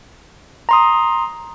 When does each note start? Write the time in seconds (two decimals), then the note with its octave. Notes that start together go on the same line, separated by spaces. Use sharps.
0.69 A#5 C6 D#6